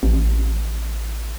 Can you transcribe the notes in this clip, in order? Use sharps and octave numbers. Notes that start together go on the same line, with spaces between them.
A1